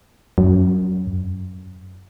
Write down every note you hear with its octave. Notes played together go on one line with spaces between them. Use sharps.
F#2